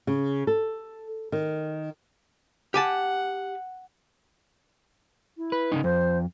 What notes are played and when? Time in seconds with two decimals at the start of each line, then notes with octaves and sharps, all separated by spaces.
0.07 C#3
0.47 A4
1.32 D#3
2.74 G4 F#5 G#5 A5
5.38 E4
5.52 B4
5.72 C#3 E3 D#4
5.84 F2 C5